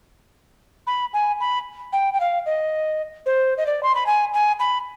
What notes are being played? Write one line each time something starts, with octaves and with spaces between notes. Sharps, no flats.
B5
G#5
B5
G5
G5
F5
D#5
C5
D#5
D5
C6
B5
G#5
G#5
B5